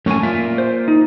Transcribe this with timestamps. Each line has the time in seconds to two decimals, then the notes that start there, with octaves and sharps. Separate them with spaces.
0.06 F#2 A3 A#3 C#5 G#5
0.23 A#3 F4 E5
0.58 C5
0.88 D#4